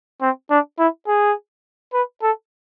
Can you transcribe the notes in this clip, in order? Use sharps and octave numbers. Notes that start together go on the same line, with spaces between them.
C4
D4
E4
G#4
B4
A4